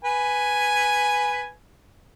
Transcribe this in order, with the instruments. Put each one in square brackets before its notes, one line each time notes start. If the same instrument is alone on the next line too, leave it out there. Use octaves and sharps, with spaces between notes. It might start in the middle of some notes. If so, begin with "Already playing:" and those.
[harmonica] B4 G#5